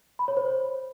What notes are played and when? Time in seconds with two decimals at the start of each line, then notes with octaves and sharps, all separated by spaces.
0.19 B5
0.28 C#5
0.37 C5